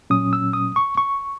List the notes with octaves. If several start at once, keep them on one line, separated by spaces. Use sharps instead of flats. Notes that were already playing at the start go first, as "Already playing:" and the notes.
A#2 F#3 C#4 D#6
E6
D#6
C#6
C#6